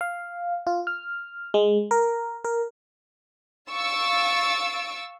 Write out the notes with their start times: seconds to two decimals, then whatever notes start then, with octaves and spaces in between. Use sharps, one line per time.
0.01 F5
0.67 F4
0.87 F6
1.54 G#3
1.91 A#4
2.45 A#4
3.70 F5 C#6 E6 A6 D7